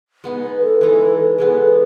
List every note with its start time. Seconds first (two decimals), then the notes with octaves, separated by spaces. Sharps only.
0.24 G#3 B3 D#4
0.43 B4
0.63 A4
0.81 E3 G#3 D#4
1.38 E3 G#3 B3 G#4
1.58 A4